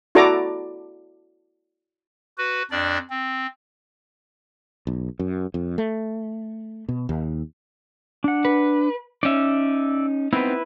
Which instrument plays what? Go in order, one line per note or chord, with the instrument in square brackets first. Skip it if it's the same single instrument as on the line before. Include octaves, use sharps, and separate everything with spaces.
[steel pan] E4 F#4 A4 D5 A#5 D6
[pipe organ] F#4 B4
F2 D4 D5
C4
[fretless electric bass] B1
F#2
F2
A3
B2
D#2
[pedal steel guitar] D4 F#5
[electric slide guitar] B4
[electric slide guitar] C#4 D#4 [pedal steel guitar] D5 E5
[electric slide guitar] B3 C4 D#4 [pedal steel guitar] E4 B4